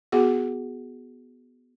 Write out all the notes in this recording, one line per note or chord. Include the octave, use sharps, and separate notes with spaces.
B3 F#4 G#4 F#5